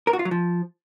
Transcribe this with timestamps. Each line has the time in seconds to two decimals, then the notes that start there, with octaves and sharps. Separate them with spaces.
0.07 A#4
0.13 F#4
0.19 F4
0.25 F#3
0.31 F3